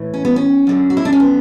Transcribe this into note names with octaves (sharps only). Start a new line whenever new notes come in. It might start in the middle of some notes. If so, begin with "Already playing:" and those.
Already playing: A2 E3
C#4
B3
C#4
F#2 D3
F#4
E4
D4
C#4
B3